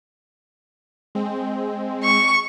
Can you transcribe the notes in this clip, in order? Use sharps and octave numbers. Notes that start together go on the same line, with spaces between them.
G#3 C4
C#6